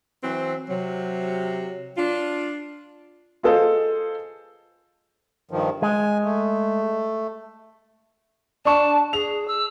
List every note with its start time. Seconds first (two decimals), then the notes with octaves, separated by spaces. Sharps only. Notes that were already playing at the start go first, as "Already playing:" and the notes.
0.23 E3 F#3 C4
0.69 C3 F#3
1.97 D4 F4
3.43 F4 G#4 A4 C5 D#5 F5
5.51 G2 D#3 F3
5.82 G#3 G#5
6.24 A3
8.65 D4 A5 C#6
9.13 G#4 F7
9.48 E6